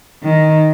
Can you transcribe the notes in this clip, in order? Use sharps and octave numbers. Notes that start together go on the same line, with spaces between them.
D#3